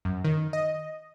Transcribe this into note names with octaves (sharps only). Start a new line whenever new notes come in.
F#2
D#3
D#5